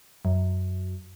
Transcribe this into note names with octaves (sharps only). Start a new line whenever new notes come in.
F#2